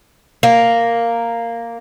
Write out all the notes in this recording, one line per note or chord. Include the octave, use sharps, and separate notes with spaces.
A#3